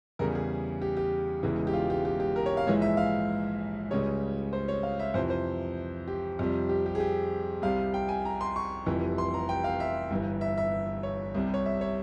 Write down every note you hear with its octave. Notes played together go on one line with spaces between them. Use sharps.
E2 C#3 G3 A#4
G#4
G4
G4
E1 E2 C#3 E3 G#3
G4
F4
G4
G4
G4
A#4
C#5
F5
A#1 G#2 E3 G#3 C#5
E5
F5
C#2 C#3 G3 C#5
C5
C#5
F5
E5
F2 C3 E3 C5
C5
G4
F2 C3 G3
G4
G4
G#4
G4
C2 C3 G3 F5
G5
G#5
A#5
C6
C#6
F1 F2 E3 G3
C6
A#5
G5
F5
E5
G1 G2 E3
E5
E5
C#5
C2 C3 G3
C#5
E5
C#5